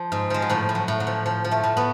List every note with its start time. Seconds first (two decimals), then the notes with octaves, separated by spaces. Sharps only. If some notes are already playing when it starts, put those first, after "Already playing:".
Already playing: F3
0.12 G#2
0.30 F3 G#3
0.42 F#3
0.49 A2 F3
0.69 A2
0.75 F#3
0.88 A2
1.00 F#3
1.07 F3
1.26 F3
1.44 F3
1.51 A3
1.63 A2
1.77 B3